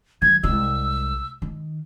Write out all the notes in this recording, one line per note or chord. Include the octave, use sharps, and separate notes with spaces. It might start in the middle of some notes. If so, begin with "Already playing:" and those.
D#3 F#3 G#6
C2 G#3 E6
D#3